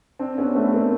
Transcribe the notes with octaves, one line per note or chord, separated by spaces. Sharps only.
C4 D4
B3 C#4
A3 B3
A#3 C4